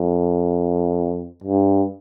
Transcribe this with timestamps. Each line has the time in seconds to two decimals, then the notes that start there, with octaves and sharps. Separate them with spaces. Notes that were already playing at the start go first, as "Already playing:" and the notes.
Already playing: F2
1.44 G2